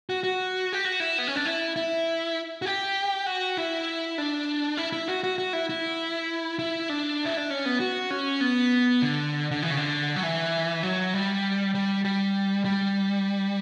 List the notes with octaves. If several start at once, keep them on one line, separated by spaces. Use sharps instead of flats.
F#4
F#4
G4
F#4
E4
B3
C#4
D4
E4
E4
F#4
G4
F#4
E4
D4
E4
E4
F#4
F#4
F#4
E4
E4
E4
D4
E4
D4
C#4
B3
F#4
C#4
B3
D3
D3
E3
C#3
D3
F#3
E3
F#3
G3
G3
G3
G3